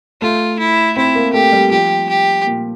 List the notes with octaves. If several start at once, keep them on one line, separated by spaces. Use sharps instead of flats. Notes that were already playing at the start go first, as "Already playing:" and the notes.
A3 F4
E4
C4 E4
A#3
A3 G4
G3
F3 G4
G4
A#2